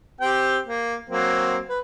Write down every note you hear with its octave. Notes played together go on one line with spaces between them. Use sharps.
C4 G4 G5
A#3
F#3 A#3 C4
B4